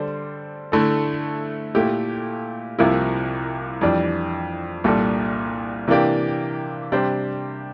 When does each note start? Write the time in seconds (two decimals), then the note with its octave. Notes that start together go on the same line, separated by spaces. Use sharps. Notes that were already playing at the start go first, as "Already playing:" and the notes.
Already playing: D3 G3 D4 A4 C5
0.72 D3 A3 E4 A4
1.75 A#2 A3 E4 G4
2.79 C2 C3 F3 A#3 E4
3.81 F2 E3 G3 D4
4.84 C2 A#2 G3 D4 A4
5.88 C3 E3 A#3 D4 G4
6.92 C3 G3 D4 G4 C5